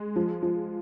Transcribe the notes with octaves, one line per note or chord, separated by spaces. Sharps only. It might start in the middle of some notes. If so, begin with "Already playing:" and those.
Already playing: G#3
F3
F3